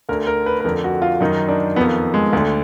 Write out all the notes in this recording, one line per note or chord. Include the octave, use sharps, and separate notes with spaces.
D2 D3 A#4
A#4
B4
B4
F2 D3 A#4
F#4
F4
F#2 D#3 D#4
D4
F2 D#3 B3
G#3
D2 D3